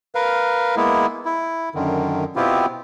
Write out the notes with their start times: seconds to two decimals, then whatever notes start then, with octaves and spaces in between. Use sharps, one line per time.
0.15 A#4 B4 F5
0.77 G#3 A#3 B3 E4
1.25 E4
1.75 F#2 D3 D#3
2.36 B2 B3 C4 E4 F4 G4